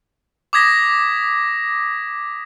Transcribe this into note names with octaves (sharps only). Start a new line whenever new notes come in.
D6 D#6 G#6 A#6 B6